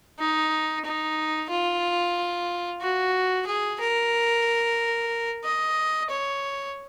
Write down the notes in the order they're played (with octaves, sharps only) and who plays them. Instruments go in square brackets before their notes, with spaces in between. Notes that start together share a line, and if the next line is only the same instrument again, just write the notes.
[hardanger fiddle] D#4
D#4
F4
F#4
G#4
A#4
D#5
C#5